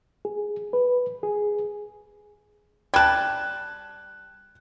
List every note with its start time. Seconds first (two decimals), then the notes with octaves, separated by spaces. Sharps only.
0.25 G#4
0.73 B4
1.23 G#4
2.94 G3 A5 F#6 G#6